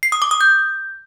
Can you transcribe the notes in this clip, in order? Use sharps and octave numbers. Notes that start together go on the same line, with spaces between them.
C7
D#6
D6
D#6
G6